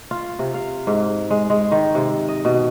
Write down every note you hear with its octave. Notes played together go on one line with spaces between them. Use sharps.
F4
C3
F5
G#2
G#3
G#3
D#3
C3
D#5
B2